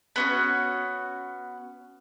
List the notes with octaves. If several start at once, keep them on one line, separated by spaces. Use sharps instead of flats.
B3 C#4 F#4